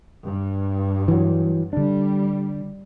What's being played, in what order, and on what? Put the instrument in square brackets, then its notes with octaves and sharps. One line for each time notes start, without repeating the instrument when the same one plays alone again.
[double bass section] G2
[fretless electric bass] E3 F#3
[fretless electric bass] D3 D4 [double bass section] G3